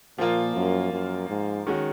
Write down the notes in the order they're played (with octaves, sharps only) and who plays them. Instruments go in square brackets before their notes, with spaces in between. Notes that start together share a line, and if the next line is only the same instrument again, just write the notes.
[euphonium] A#2 [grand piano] F3 A#3 F4
[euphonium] F#2
F#2
G#2
[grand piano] D#3 G#3 C#4 F#4